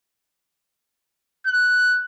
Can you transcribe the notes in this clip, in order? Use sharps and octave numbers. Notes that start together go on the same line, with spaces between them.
F#6